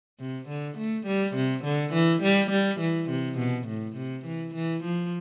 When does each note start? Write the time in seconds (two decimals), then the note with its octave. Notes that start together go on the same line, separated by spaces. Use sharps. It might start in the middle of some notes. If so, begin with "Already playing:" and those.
0.20 C3
0.48 D3
0.78 A3
1.07 G3
1.36 C3
1.64 D3
1.93 E3
2.23 G3
2.51 G3
2.80 E3
3.10 C3
3.39 B2
3.67 A2
3.97 C3
4.25 E3
4.55 E3
4.84 F3